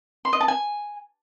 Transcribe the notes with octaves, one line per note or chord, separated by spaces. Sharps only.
C6
D#5
A5
G#5